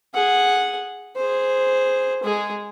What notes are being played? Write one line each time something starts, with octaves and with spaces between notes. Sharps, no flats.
G#4 F#5
G#4 C5
G#3 G#4